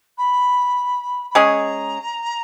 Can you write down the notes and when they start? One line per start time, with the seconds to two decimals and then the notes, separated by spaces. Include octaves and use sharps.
0.17 B5
1.30 B5
1.35 G#3 C#4 G#4 A#5